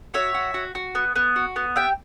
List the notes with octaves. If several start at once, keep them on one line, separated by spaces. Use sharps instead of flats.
F#4 C#5 E5
F#4
F#4
F#4
B3
B3
F#4
B3
G4 E5 G5